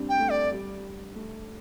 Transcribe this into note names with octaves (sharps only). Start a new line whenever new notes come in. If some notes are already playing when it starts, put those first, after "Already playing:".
Already playing: G3 C4 D4
G5
A3
D5
G3
A3